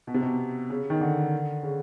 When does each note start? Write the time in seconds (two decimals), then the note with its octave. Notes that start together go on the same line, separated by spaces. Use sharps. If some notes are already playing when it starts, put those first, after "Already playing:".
0.07 B2
0.14 C3
0.22 B2
0.70 C#3
0.90 D#3
1.01 D3
1.63 C#3